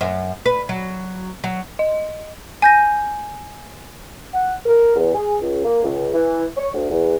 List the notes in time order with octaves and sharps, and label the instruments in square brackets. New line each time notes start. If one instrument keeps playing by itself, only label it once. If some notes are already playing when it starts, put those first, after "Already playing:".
[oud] F#2
B4
F#3
F#3
[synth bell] D#5
[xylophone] G#5 G6 A#6
[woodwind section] F#5
A#4
E2
G#4
C#2
A#3
C#2
E3
C#5
D2
E2